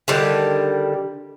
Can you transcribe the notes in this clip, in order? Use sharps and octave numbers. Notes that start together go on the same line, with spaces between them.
D3 D#3 G3